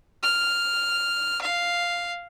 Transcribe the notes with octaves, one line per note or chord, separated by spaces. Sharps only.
F6
F5